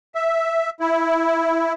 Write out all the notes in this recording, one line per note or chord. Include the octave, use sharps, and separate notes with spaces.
E5
E4